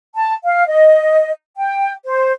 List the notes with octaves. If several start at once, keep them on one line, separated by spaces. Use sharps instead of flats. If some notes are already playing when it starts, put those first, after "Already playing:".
A5
F5
D#5
G5
C5